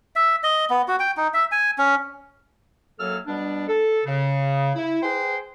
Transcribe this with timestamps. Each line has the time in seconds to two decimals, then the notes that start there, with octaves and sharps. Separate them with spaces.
0.16 E5
0.43 D#5
0.70 B3
0.88 F#4
1.00 G5
1.17 D#4
1.34 E5
1.52 G#5
1.78 C#4
2.99 F#2 F#3 A#3 A4 E6 F6
3.27 B2 G3 B3 D4
3.68 A4
4.05 C#3
4.75 E4
5.03 G#4 B4 C5 G5 C6